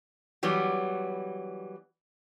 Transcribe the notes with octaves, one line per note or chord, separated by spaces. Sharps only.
E3 F#3 G3 B3